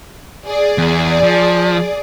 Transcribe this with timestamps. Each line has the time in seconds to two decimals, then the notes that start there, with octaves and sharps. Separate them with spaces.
0.47 G#4 D5
0.78 E2
1.23 F3